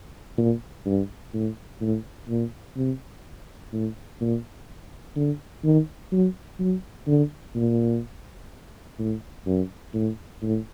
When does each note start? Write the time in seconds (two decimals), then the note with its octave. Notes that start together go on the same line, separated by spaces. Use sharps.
0.38 A#2
0.86 G2
1.33 A2
1.81 A2
2.29 A#2
2.77 C3
3.72 A2
4.21 A#2
5.16 D3
5.64 D#3
6.12 F#3
6.59 F#3
7.07 D3
7.55 A#2
8.99 A2
9.46 F#2
9.94 A2
10.42 A2